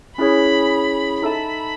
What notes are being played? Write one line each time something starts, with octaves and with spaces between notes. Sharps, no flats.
C#4 E4 G#4 C#5 B5
D#4 A4 E5 A5 B5